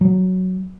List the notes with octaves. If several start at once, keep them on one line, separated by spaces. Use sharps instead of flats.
F#3